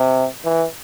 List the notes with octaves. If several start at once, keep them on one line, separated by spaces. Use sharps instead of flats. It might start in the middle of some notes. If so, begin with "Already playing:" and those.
Already playing: C3
E3